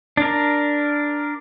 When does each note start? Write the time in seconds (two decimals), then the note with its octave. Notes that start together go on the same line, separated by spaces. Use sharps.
0.17 D4 A#4